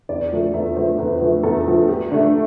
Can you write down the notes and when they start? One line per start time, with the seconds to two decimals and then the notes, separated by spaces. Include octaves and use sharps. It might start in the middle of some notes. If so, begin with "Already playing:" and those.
0.09 E2 D5
0.32 D3 F3 A3
0.54 E2 E5
0.76 D3 F3 A3 C5
0.98 E2 B4
1.21 D3 F3 A3
1.44 E2 A4
1.66 D3 F3 A3
1.88 G2 G4
2.11 D3 A3 D4